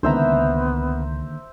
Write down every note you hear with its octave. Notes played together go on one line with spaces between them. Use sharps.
C#2 D3 D#3 A#3 B3 C5 E5 A#5